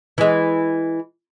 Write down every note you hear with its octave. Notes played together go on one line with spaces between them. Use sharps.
E3 G#3